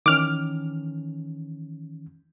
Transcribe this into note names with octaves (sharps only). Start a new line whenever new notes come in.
D#3 E3 C#4 D6 F6